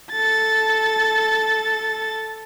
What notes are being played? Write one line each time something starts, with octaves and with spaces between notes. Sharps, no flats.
A4 A6